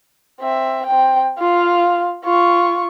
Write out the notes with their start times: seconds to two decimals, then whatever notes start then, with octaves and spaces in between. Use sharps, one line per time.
0.40 C4 E5
0.86 C4 G5
1.39 F4 F5
2.25 F4 C#6